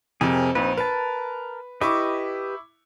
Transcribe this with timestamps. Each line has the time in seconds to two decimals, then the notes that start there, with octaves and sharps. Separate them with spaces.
0.21 F2 C3 G#4 A#4
0.55 A#1 C4 D#4 B4
0.77 A#4 B4 A5
1.81 E4 G4 B4 D#5 C#6 D6